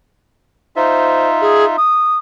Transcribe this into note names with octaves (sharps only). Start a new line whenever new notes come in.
D#4 F4 C5 E5
G#4
D#6